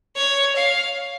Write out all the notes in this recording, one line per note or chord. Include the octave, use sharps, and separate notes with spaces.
C#5
F5